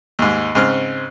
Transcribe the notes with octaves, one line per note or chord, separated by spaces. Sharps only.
D#2 G#2
G#2 C#3 C4 F6